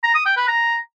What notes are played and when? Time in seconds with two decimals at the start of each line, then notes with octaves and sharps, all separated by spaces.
0.04 A#5
0.15 D#6
0.26 G5
0.37 B4
0.48 A#5